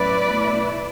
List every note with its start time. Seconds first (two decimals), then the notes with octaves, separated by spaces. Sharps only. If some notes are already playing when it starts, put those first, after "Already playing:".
Already playing: A2 F#3 C#4 E4 B4 D5
0.28 B2 A3 E4